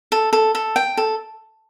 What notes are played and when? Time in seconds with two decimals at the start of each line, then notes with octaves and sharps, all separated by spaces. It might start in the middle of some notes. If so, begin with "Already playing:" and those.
0.12 A4
0.33 A4
0.55 A4
0.76 G5
0.97 A4